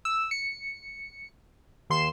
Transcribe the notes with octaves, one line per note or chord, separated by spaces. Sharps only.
E6
C#7
D#2 C6 C7 E7